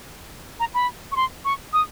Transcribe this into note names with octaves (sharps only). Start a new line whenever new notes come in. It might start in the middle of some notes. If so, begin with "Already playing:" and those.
A#5
B5
C#6
C6
C#6
D#6